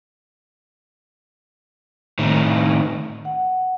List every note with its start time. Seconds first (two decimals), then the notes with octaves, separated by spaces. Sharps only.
2.19 A2 D#3
3.25 F#5